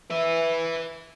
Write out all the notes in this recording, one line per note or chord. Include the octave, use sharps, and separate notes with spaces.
B4 E5